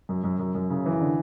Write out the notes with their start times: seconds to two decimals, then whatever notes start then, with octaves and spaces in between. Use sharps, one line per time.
0.09 F#2
0.24 F#2
0.39 F#2
0.55 F#2
0.70 C#3
0.86 E3
1.00 D3